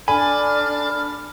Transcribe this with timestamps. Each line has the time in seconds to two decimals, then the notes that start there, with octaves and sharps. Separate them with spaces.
0.08 D4 A4 D5 G#5 B5 F6